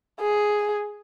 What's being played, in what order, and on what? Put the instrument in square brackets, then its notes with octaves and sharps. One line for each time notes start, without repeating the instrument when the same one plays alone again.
[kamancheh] G#4